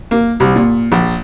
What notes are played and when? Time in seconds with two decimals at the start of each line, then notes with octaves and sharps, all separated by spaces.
0.11 A#3
0.40 C2
0.56 A#2
0.92 A#1